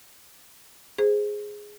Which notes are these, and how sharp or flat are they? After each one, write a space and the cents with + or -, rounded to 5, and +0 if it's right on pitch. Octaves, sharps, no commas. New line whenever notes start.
G#4 +0 C5 +0